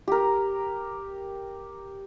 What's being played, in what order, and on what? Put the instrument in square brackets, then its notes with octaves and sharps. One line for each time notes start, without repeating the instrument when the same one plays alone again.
[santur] G4 A#4